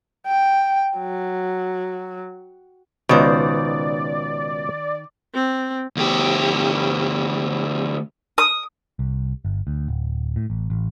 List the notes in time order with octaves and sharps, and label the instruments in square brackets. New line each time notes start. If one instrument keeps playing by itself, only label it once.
[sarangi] G5
F#3
[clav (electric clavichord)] C#2 B2 [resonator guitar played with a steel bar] D#3 C5 [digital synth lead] D5
[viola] C4
[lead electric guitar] D2 G4
[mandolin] D#6
[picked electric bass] C2
G1
D2
D1
A2
A1
A1